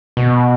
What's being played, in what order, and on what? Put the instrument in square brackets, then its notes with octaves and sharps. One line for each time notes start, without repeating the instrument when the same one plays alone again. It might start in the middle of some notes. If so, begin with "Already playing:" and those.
[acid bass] B2